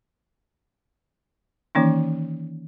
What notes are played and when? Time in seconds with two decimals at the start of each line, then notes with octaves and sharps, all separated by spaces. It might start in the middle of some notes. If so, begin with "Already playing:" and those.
1.75 D#3 E3 A#3 C#4 D#4